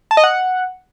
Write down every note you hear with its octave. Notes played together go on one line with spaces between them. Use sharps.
A5
D#5
F#5